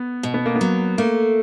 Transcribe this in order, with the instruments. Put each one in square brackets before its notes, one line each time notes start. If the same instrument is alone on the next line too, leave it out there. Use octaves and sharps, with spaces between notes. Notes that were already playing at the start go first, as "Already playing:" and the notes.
Already playing: [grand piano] B3
[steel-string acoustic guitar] B2
[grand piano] B3
A#3
B3
[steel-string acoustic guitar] F#3
[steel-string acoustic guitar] A3 [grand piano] A#3